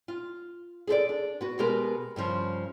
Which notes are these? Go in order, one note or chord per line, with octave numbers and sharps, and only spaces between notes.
F4
G#4 A4 C5 D5
D4
B3 F#4
B2 G#3 B3 G4 A#4
G2 C#3 F3